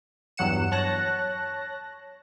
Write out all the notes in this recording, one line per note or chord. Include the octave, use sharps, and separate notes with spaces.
E2 G2 F#3 F#5 C#7 E7
C#5 A5 F#6 A#6